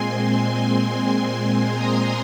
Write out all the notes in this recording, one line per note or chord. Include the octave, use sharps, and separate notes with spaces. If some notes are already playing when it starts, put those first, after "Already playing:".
Already playing: A#2 G#3 C4 G#5 C6
G#5 C6
A#5 D#6